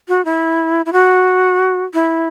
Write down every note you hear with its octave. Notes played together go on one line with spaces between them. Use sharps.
F#4
E4
E4
F#4
E4